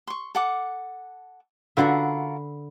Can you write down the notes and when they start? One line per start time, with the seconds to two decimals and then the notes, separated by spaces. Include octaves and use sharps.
0.07 C6 C#6
0.35 A4 F#5 D6
1.77 D3 F4 F#4 A#4 B4 E5